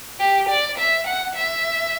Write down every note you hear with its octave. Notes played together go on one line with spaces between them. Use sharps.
G4
D5
E5
F#5
E5